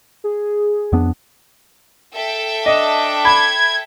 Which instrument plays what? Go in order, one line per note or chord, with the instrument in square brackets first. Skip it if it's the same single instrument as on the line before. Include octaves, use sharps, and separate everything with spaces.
[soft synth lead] G#4
[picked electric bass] F2 B3 D4
[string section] A4 E5 G5
[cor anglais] D4 [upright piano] D#5
[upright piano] B5 [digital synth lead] G#6